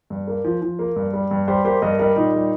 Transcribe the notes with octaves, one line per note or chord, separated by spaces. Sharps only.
G2
A#3
F3
F3
A#3
G2
G3
G2
G3 G4 C5
A#3 G4 C5
G2 A#4 D#5
G3 A#4 D#5
A#2 D#4
G3